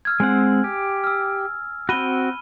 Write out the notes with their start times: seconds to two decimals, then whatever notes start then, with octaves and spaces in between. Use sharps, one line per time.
0.05 E6 F6 G#6
0.20 G#3 C4 F#5 G#5
0.64 G4
1.04 E6 F6
1.89 C4 F#4 B5 D#7 G7